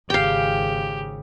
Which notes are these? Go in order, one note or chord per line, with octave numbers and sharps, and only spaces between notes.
G#1 C#3 G4 F5 G5